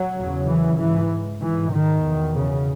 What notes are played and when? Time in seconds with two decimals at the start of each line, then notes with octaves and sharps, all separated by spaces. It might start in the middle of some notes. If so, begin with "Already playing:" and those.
Already playing: F#3
0.16 E2 C#3
0.47 E3
0.78 G#2 E3
1.41 G#2 E3
1.73 D#3
2.04 E2 B2
2.35 C#3